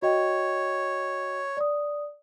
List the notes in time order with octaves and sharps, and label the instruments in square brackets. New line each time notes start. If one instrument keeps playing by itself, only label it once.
[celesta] F#4 D#5 G5 [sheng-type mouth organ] C#5
[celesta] D5 D#6